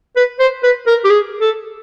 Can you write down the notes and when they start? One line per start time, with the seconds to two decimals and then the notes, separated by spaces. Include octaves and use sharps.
0.16 B4
0.39 C5
0.63 B4
0.87 A#4
1.04 G4
1.10 G#4
1.41 A4